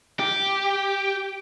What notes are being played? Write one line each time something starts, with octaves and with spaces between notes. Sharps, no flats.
G4